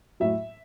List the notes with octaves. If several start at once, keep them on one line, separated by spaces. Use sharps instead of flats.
A2 F#3 E5